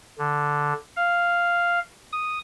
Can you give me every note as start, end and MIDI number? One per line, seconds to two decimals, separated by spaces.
0.18 0.73 50
0.96 1.79 77
2.12 2.39 87